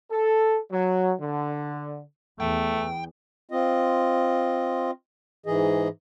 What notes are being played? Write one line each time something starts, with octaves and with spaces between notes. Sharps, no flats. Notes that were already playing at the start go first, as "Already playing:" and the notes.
A4
F#3
D3
E2 A3 G5
C4 F4 D#5
G#2 E3 G#4 D#5